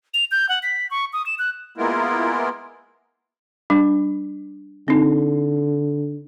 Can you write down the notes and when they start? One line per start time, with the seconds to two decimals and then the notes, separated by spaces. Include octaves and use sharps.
0.14 F7
0.31 G6
0.49 F#5
0.63 B6
0.91 C#6
1.13 D#6
1.26 E7
1.39 F#6
1.78 G#3 A#3 B3 E4 F4 A#4
3.70 G3 D4
4.88 D3 C4 D#4